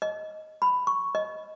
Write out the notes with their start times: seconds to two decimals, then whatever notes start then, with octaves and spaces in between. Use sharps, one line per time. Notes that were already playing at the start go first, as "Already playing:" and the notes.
0.02 D#5
0.62 B5
0.87 C#6
1.15 D#5